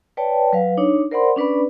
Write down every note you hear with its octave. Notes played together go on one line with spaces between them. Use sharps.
B4 C#5 D5 G5 A5
F#3 B4 F5
D4 D#4 C#5
A#4 C5 D5 F#5 B5 C6
C#4 D4 B4 D5 B5